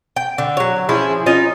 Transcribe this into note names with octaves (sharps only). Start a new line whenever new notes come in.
G5
D3
F#3 C#5
F3 C#4 E4 G#4
C#4 D#4 F4